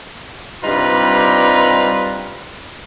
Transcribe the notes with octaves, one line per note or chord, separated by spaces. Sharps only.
G2 C3 G3 D#4 F4 B4